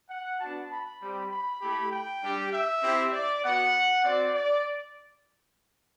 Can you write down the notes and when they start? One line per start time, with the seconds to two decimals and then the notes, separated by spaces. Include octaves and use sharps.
0.10 F#5
0.40 B3 D4 F#4 A5
0.71 B5
1.01 G3 C4 G4
1.31 B5
1.61 A3 E4 G4
1.92 G5
2.22 G3 D4 G4
2.53 E5
2.82 C4 E4 G4
3.13 D5
3.44 B3 F#4 F#5
4.04 C4 F#4 D5
4.35 D5